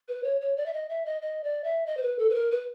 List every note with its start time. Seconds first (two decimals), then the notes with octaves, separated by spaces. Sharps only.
0.08 B4
0.24 C#5
0.41 C#5
0.57 D5
0.66 E5
0.73 D#5
0.89 E5
1.06 D#5
1.22 D#5
1.44 D5
1.64 E5
1.86 D#5
1.97 C5
2.02 B4
2.19 A4
2.30 B4
2.35 A#4
2.51 B4